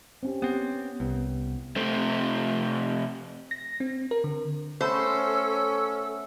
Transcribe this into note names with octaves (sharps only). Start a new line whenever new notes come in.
C4 C#4 G4
B3 C4 G4
C2 B3
C3 A3 C4
A#6
C4
A#4
D3
A3 B3 C#4 A4 C5 B5